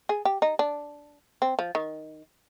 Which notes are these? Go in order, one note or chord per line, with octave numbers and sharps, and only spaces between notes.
G#4
G4
D#4
D4
C4
F3
D#3